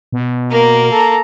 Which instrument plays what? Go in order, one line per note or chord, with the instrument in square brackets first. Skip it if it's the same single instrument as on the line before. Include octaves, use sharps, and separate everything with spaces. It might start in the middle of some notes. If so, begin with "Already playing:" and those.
[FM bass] B2
[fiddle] A#3 [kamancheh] A#4
[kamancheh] A4 A#5